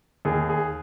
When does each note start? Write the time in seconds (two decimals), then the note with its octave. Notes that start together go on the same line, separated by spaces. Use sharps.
0.25 D#2 G#4
0.49 G#4